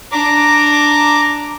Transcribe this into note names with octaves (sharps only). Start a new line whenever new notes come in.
D4 A#5 D6